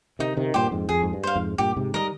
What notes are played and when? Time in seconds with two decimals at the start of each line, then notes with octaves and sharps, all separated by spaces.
0.19 C3 D#3 D#4
0.37 C3 D#3
0.54 G2 A#2 G4 C5
0.71 F2 G#2
0.89 F2 G#4
1.03 G#2
1.13 G2
1.23 C5 F5
1.36 F2 G#2
1.58 G2 A#2 G4
1.77 G#2 C3
1.94 D#3 G3 A#4 D#5